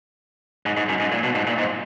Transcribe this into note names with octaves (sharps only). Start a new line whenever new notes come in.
G#2
G#2
F#2
G#2
A#2
B2
G#2
A#2
G#2